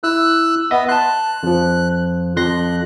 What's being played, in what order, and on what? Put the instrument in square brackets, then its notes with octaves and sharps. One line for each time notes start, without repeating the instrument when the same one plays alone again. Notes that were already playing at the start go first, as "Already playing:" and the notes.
[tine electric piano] E4 [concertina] E6 F#6
[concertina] B3 [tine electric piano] D#5 E5 D#6
[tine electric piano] A5 C6 [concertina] F#6
[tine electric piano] F2 F3
[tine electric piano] F2 C6 A#6 [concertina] F#6